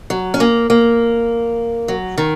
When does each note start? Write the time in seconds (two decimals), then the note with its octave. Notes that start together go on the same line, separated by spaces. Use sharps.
0.10 F#3
0.34 C#4
0.40 A#3
0.70 A#3
1.88 F#3
2.18 D#3